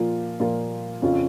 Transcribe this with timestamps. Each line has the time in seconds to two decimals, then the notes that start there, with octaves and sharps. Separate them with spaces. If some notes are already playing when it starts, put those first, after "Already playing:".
Already playing: A#2 F3 A#3 F4
0.40 A#2 F3 A#3 F4
1.02 F2 C#3 F3 C#4 F4